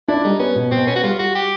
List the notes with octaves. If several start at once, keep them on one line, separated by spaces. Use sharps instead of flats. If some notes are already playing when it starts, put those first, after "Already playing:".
D4 E4
G3 D#4
B3 C#4
B2
B2 C4
B3 C#4
F#4
G3 F4
G3 F#4
G4